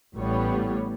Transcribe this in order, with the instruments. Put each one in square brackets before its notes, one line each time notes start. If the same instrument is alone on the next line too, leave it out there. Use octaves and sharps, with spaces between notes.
[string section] A1 A2 G3 B3 C#5